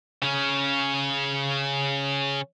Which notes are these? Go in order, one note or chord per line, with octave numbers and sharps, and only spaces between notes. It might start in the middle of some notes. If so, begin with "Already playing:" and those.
C#3 C#4